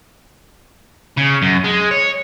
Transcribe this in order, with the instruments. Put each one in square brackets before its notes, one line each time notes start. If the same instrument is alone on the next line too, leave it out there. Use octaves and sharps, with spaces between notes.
[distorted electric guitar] C#3
F#2
G#3
C#5